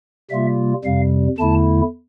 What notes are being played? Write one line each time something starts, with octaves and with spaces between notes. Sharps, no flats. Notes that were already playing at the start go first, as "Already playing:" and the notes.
C3 G3 A#3 F4 E5
F2 C3 G3 F5
E2 D3 A3 E4 A5